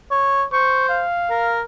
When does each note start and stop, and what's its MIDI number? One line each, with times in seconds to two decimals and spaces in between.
0.11 0.43 73
0.53 1.03 72
0.53 0.86 85
0.89 1.59 77
1.30 1.62 70